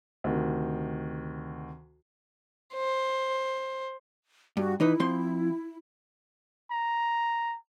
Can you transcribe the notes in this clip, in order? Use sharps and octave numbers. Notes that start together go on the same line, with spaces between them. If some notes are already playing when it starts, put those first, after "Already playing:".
D2 C3 D#3
C5
G2 F#4
E3 D#4 E4 B4
F3 C4 C6
A#5